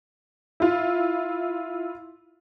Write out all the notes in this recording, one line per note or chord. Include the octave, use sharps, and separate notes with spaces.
E4 F4